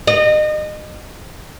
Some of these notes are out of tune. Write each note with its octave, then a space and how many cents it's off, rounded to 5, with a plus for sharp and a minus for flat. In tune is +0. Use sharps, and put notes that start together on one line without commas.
D#5 -30